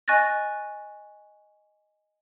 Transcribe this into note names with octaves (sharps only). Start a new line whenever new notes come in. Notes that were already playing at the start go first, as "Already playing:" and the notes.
D#5 G#5 C#6 F#6 A6 A#6